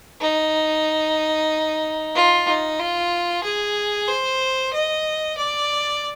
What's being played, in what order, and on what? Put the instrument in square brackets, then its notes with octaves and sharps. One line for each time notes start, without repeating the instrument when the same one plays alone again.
[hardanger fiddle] D#4
F4
D#4
F4
G#4
C5
D#5
D5